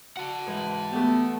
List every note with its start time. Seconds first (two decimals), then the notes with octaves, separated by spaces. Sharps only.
0.17 F#4 F#5 A5
0.47 G#2 E3 B4
0.92 A3 B3 G4 B4